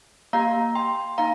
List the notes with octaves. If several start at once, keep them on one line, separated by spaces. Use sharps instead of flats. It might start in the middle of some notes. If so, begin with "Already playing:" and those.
A#3 G4 F5 A#5
G5 C6
A#3 D#4 F5 A#5